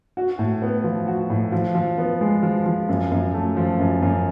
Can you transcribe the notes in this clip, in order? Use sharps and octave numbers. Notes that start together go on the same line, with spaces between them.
F#4
A2
B3
F3
F#4
A2
F3
F3
B3
G#3
F3
F3
F#2
F#2
A3
F3
F#2
F#2